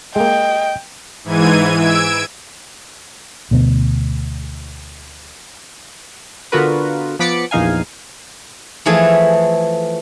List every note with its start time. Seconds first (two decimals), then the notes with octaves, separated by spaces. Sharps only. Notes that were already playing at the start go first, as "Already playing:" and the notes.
0.16 G#3 A#3 D#5 G5
1.24 G#2 E3 G#6 D#7
1.76 E6 G#6 D7
3.51 D2 B2 B3
6.52 D3 B3 F4 F#4 A#4 B4
7.19 F3 B3 B5 D6 A6 C#7
7.51 A#1 E2 D#4 F5 G#5
8.86 E3 F3 A3 G#4 A4